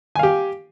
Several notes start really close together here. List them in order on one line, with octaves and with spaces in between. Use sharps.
G#5 F5 G4